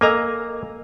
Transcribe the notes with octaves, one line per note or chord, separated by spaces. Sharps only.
A#3 A4 D#5 G#5 A#5 E6